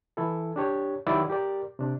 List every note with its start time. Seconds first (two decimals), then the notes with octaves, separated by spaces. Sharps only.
0.17 E3 E4 A4
0.56 D4 G4 C#5
1.07 D#3 F#3 E4 G4 D5
1.30 G4 A#4 D5
1.79 C3 D4